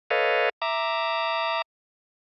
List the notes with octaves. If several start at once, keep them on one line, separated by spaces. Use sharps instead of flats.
A4 B4 C#5 D#5 F5
E5 A#5 D6